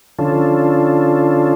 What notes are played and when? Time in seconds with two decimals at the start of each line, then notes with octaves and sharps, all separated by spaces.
0.19 D3 F3 C#4 D4 F4 A4